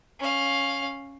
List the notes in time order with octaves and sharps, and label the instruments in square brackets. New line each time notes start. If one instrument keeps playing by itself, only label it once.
[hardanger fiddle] C#4 F5